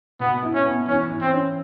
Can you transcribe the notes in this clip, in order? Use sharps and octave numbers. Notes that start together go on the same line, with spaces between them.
B2 B3
E4
C#4
B3
E3 C#4
E3
C4
C#4